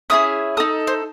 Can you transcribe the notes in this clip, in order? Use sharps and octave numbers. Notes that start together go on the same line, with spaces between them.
C#4 E4 G#4 D#6
D#4 A4 D#6
C5